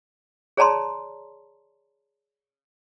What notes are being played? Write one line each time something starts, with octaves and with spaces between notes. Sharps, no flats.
G#4 C#5 D5 A5 A#5 C6